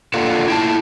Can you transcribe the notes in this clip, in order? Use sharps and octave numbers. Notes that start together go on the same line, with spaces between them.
A#3 D4 F4 A4 F5 F#5
E4 G5 A5